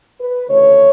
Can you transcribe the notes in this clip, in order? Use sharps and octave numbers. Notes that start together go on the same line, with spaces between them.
B4
D2 C#3 E3 A3 C#5